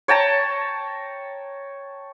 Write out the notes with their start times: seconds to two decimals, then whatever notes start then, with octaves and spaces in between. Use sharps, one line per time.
0.08 C#5 G5 A5 A#5